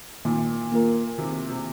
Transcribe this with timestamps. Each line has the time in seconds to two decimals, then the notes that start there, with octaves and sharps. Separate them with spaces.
0.25 A#2 D#3
0.72 A#3 F4 A#4
1.18 C3 D#3
1.50 C3